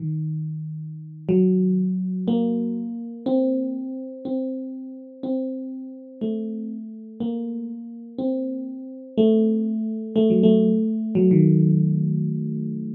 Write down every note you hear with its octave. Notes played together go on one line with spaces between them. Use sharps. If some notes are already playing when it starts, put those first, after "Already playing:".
Already playing: D#3
F#3
A#3
C4
C4
C4
A3
A#3
C4
A3
A3
F#3
A3
F#3
D#3